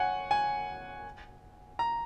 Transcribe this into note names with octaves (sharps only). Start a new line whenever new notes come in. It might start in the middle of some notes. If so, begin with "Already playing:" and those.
Already playing: C#5 F#5 G#5
G#5
A#5